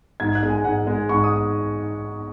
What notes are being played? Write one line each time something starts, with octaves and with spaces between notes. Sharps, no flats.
G#2 G#6
F#6
G#3
G#5
G#2 F#5
G#3
G#2 C#6
D#6